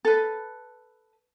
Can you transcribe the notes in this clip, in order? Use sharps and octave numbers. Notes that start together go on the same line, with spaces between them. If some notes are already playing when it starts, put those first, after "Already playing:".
A4 B4